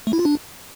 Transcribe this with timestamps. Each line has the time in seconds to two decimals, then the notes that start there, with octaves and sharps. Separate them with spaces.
0.07 A3
0.13 E4
0.19 F4
0.25 D4